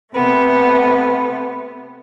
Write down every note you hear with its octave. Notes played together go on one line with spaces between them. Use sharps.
C3 A3 B3